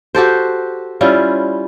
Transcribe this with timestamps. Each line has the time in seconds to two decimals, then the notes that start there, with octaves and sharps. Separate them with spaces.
0.15 F#4 G4 A4 C5
1.01 G3 C#4 E4 F4